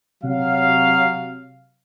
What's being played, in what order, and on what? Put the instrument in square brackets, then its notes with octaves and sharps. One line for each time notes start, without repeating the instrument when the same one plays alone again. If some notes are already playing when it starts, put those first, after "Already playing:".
[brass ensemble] C3 F#3 F5